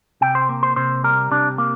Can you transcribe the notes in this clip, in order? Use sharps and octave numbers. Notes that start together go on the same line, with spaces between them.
C3 G5
C5
A#3
C5
C3 C5
G3 A#4
C3 D4
A#3